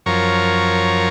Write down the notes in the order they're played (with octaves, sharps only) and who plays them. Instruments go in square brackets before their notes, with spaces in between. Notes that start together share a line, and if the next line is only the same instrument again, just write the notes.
[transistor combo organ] F#2 F3 A#4 C#5